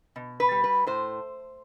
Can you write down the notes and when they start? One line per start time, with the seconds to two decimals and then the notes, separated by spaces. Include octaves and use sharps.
0.16 B2
0.40 B4
0.51 G3
0.64 B4
0.87 A2 C5